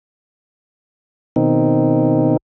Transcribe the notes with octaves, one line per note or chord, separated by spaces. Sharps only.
B2 D#3 C4 D#4